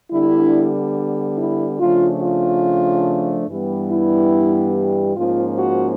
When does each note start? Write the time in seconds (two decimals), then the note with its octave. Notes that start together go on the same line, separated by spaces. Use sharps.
0.12 D3 G3 B3 D4 E4
1.37 E4
1.79 C#3 F3 A3 D4 F4
2.21 F4
3.48 G2 E3 G3 B3
3.90 E4
5.16 G#2 F3 A#3 C#4 F4
5.58 F#4